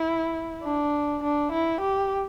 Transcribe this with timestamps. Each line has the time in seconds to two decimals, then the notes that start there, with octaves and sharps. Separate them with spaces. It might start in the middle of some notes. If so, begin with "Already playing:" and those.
Already playing: E4
0.63 D4
1.23 D4
1.52 E4
1.81 G4